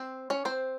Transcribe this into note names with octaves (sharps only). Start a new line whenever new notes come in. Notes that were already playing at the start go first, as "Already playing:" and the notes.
Already playing: C4 C5
C#4 C#5
C4 C5